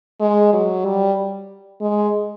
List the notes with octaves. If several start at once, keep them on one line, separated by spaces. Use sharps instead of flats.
G#3
F#3
G3
G#3